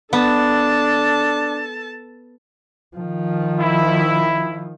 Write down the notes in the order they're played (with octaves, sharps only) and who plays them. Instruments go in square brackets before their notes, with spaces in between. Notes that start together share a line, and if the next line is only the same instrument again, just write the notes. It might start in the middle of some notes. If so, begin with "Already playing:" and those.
[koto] B3 [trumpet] D4 [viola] A4 A5
[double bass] D#3 F3
[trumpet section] E4